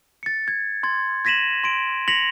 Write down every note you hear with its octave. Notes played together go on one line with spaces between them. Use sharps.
A6 C#7
G#6
C6 G#6 A6
G#6 A#6 B6 D#7 E7 F#7
C6 D7
A#6 B6 C#7 F7 F#7